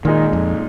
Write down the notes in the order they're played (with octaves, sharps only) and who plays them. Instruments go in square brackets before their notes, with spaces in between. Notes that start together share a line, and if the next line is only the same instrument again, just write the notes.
[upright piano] A#2 G#3 D#4 [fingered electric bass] D#3
[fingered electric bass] F2